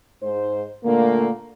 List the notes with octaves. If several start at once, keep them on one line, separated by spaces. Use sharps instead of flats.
G#2 C5
A#2 D3 A3 A#3